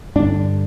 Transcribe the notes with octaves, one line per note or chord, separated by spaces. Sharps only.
G2 D3 D4